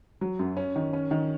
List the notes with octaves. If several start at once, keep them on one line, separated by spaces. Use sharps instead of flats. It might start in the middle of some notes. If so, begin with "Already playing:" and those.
F#3
F#2
C#4
D#3
C#4
D#3